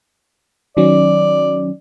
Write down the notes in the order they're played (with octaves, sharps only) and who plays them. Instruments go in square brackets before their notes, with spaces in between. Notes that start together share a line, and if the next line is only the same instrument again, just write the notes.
[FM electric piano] D#3 F#3 C#4 [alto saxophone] D5